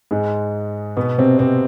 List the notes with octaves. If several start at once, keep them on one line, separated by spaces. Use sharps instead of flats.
G#2 G#3
B2 B3
C3 C4
C3 C4